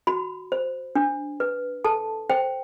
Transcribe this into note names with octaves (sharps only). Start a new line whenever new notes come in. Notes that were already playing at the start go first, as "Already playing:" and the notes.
F#4 B5
C5
D4
B4
A4 A5
C5 G5